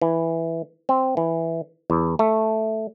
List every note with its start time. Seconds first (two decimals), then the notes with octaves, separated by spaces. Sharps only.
0.02 E3
0.89 C4
1.17 E3
1.90 E2
2.19 A3